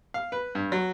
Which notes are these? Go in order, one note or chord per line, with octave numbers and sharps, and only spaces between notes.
F5
B4
G2
F#3